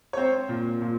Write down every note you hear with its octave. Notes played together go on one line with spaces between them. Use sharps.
C#5
C4 C5
A#2
A#2